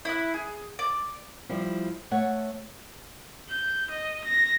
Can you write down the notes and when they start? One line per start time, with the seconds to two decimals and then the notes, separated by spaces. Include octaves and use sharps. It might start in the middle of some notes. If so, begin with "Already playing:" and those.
0.05 E4 F#6
0.34 G#4
0.79 D5
1.49 F3 G3 E4
2.11 A3 C#5 F#5
3.49 G6
3.90 D#5
4.24 A#6